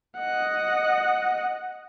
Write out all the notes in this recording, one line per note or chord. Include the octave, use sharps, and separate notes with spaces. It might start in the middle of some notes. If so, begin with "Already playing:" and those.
D#5 F#5